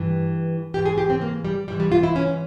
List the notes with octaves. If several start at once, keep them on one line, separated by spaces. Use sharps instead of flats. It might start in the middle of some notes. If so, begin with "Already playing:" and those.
Already playing: G2 E3
G#2 E3 G4
G#4
G4
C4
A#3
G3
G#2 E3 G3
G3
F4
E4
C#4